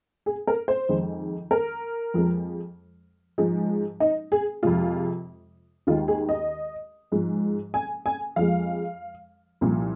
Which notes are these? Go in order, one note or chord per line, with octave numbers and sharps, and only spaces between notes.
G#4
A#4
C5
F2 D#3 G#3
A#4
F2 F3 G#3
G#2 F3 G#3
D#4
G#4
F2 C3 G#3 F4
D#2 D#3 G#3 F4
G#4
D#5
G#2 F3 G#3
G#5
G#5
F2 F3 G#3 F5
C2 A#2 F3